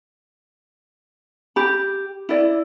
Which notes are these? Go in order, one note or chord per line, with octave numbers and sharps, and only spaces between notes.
G4 B5
E4 D5